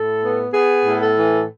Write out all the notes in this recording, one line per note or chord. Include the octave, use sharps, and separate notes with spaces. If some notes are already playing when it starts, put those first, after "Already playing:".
Already playing: A2 A4
B3
B3 G#4
A2
A4
E3